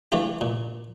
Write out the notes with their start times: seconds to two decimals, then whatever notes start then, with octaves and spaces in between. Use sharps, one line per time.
0.12 E3 A3 D4 F4 G4
0.41 A#2